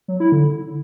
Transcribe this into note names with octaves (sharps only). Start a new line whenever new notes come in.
F#3
E4
D3